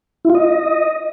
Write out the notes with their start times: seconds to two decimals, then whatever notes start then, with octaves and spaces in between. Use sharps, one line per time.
0.25 E4
0.30 F4
0.35 D#5